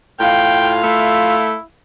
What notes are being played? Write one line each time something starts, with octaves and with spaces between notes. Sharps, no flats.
A2 F4 F5 G5
A3 E4